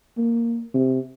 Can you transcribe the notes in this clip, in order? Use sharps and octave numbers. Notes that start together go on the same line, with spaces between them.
A#3
C3